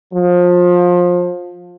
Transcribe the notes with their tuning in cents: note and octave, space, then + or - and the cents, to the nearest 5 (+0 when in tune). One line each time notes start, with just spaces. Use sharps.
F3 +25